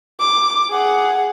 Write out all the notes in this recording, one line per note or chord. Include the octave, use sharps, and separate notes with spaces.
D6
G#4 F#5